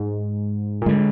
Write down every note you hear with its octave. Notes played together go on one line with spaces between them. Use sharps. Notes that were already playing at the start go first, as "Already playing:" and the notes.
Already playing: G#2
A#2
D3 G#3